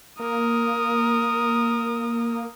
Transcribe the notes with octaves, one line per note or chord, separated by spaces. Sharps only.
A#3 A#4 D#6